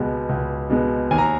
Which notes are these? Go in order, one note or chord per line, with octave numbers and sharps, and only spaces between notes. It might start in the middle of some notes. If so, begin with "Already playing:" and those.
Already playing: C#2 B2 G#3 B3
C#2
B2 G#3 B3
D#2 G#5
A#5